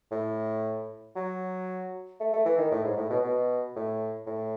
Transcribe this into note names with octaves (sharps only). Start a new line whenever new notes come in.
A2
F#3
A3
A3
E3
D#3
A2
G#2
A2
B2
B2
A2
A2